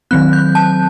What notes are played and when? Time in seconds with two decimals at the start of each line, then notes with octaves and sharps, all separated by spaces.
0.11 D#3 F#3 C4 F#6
0.33 G6
0.55 A5